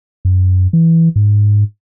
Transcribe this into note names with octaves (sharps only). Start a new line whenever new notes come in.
F#2
E3
G#2